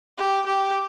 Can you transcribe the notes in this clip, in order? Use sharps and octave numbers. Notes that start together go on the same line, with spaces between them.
G4
G4